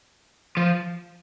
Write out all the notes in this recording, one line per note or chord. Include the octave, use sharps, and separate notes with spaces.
F3